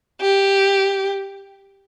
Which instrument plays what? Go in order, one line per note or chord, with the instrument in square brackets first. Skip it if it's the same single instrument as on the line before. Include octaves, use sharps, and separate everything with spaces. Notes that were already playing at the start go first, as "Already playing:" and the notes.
[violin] G4